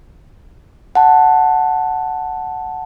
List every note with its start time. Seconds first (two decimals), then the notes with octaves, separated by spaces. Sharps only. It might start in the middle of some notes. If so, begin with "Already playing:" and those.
0.95 F#5 A5